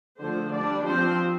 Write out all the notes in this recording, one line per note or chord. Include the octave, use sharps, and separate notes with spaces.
D3 F3 A3 C5
G3 D4 D5
F3 C4 C5